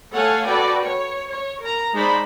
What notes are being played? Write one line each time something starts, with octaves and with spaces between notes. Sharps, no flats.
A3 A4 C#5 F5 F#5 G#5
F#4 A4 B4 D5 G5
C#5
C#5
A#4 A#5
G#3 D#4 C5 D5 B5